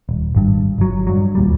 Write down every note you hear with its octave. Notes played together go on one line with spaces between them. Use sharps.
D#1
G#1 G2
G1 F#3
G2 F#3
D#2 A#2 G3